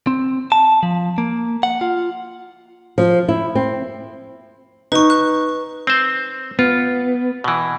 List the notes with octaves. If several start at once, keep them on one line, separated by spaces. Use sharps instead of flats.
C4
A5
F3
A#3
F#5
F4
F3
E4
C4
D#4 B4 C#6
F#6
C4 C5
B3 F4
B2 E3